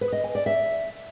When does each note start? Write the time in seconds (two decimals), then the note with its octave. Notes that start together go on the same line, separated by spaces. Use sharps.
0.01 B4
0.12 D#5
0.24 G#5
0.35 D5
0.46 E5